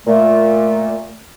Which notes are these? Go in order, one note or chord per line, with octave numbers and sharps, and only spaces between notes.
A#2 A3